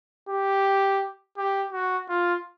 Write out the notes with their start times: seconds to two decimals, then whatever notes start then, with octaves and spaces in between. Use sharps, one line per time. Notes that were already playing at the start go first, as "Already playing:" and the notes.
0.29 G4
1.38 G4
1.73 F#4
2.09 F4